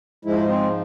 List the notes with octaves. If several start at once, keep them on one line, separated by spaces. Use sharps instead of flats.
G#2 F3 G#3 E4
C4